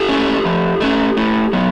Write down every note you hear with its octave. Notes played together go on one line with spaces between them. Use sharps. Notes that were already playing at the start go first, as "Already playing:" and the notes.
Already playing: G4 A4
A3 C#4
F3
A3 C#4
A2
F#3 B3